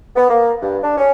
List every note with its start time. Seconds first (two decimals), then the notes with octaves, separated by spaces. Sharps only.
0.16 B3
0.29 A#3
0.62 G2
0.83 D4
0.98 C#4